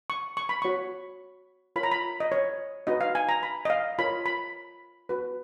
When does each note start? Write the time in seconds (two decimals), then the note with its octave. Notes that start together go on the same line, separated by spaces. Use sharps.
0.10 C#6
0.37 C#6
0.49 B5
0.62 F#4 C#5 C#6
1.76 F4 A#4 C#5 B5
1.83 A#5
1.91 B5
2.20 D#5
2.32 C#5
2.87 D#4 F#4 B4 D#5
3.01 F5
3.15 G#5
3.29 A#5
3.43 B5
3.65 D#5
3.70 F5
3.99 F4 A#4 C#5 B5
4.26 B5
5.09 F#4 B4